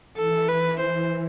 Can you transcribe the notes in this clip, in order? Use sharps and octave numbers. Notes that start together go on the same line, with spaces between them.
E3 A4
B4
C5